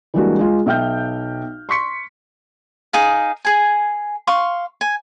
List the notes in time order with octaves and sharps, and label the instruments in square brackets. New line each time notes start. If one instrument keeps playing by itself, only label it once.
[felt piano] E3 G3 G#3 A#3 D4 F#4
G#3 F4
B1 E5 G5 F6 G6
C6 C#6 B6 C#7
[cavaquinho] D#4 G#4 F5
G#4 G#5
F5 C6 C#6
G#5